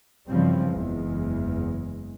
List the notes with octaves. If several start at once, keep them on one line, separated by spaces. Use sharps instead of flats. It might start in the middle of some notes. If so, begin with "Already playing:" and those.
G2 C#3 E3 F3 G3 C4
F#1 E2 G#3